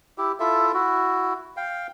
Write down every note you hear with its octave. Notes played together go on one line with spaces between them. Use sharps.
E4 G4
E4 F4 A4 E5
E4 F#4
F5 G5